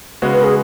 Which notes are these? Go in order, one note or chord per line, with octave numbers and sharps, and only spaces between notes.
C#3 G#3 B3 F#4
B4
G#4